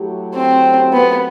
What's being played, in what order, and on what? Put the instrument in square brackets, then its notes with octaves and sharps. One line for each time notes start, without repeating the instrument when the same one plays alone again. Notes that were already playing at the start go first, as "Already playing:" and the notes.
Already playing: [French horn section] F#3 A3 E4 G4
[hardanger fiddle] C4
B3